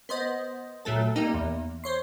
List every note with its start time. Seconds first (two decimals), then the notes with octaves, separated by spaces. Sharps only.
0.09 B3 C5 D#5
0.85 A#2 F#3 A3 A4
1.16 G3 A#3 D#4 G4
1.34 E2
1.84 C5 C#5 C6